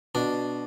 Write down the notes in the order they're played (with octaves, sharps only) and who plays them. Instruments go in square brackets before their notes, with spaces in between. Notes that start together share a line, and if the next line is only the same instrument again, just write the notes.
[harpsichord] B2 D4